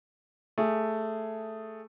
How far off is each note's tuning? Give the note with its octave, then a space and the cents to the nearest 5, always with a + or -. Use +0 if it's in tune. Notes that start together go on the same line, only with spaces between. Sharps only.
A3 +0 G#4 +0